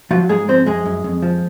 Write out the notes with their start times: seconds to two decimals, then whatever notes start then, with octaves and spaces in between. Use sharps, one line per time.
0.11 F3 F#3 F4
0.29 G#2 G#3 G#4
0.48 F3 C4 C5
0.66 F#2 G#3 G#4
0.85 F#2
1.04 F2
1.22 F3